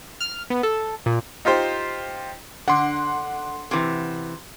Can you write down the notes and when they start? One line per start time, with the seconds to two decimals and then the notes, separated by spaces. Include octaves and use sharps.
0.21 F6
0.50 B3
0.63 A4
1.06 A#2
1.45 D#4 F4 G4 C5
2.68 D3 F#5 C6
3.71 C3 E3